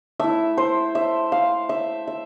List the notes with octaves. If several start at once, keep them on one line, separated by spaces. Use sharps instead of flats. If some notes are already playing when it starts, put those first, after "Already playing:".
A3 E4 E5
C5
E5
F5
E5
E5